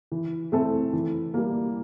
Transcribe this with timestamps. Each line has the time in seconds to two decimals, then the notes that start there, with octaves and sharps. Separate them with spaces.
0.12 E3
0.52 A3 C4 E4 A4
0.93 E3
1.34 G3 A#3